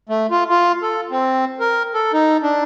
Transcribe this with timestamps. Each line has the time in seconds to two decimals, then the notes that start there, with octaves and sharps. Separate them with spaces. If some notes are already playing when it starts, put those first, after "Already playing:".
0.09 A3
0.31 F4
0.49 F4
0.82 A4
1.11 C4
1.60 A#4
1.94 A4
2.13 D#4
2.43 D4